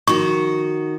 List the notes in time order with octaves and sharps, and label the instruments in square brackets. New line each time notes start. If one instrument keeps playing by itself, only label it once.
[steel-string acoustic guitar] D#3 F#4 [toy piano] C#6